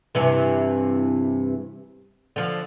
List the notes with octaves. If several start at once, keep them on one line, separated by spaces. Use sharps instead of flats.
G2 C3 E3
D3 F3